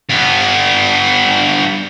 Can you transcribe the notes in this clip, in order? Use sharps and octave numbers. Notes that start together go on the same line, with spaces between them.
G2 B3